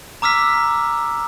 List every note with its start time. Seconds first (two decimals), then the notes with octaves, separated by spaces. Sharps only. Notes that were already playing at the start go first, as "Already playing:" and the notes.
0.22 A#5 D6 E6 F6 B6